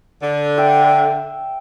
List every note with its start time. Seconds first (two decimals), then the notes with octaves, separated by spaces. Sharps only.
0.22 D3
0.58 E5 G5